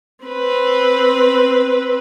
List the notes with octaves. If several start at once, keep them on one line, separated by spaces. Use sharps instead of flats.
C4 B4